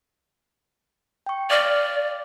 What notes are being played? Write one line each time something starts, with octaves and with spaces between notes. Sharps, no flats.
G5 C#6
D5 F5 D6 F6